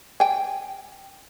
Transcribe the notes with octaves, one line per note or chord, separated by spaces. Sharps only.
G5 G#5